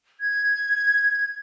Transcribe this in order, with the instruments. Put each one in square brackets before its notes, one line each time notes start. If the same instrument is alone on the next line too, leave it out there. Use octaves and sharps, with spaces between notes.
[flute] G#6